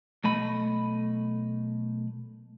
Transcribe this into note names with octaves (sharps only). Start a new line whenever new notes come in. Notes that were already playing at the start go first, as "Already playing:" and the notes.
B1 A3 D#5 B5